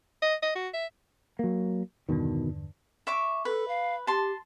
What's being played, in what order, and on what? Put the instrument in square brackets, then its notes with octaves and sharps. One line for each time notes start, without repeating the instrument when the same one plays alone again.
[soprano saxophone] D#5
D#5
F#4
E5
[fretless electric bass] F#3 A#3
[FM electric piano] E2 G2 D3 [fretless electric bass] B2 D#3
[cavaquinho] E5 C#6 D6
[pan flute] A4 [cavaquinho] B4
[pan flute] F5
[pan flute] G4 [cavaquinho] A5 C6